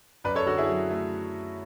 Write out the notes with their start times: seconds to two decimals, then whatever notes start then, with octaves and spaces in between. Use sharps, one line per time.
0.24 F#2 B4 D5
0.35 A4 C#5
0.47 D3 F#4 A4
0.57 E4 G#4
0.69 F#3
0.90 A3